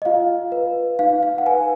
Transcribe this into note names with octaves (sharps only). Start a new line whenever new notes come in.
D#5
F4 F5
B4
D#4 F5
F5
F#5
B4 G#5